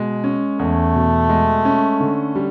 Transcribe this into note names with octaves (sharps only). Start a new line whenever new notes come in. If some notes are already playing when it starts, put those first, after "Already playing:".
Already playing: B2 G#3
C#4
E2 A3
B2
G#3
C#4
D3
G3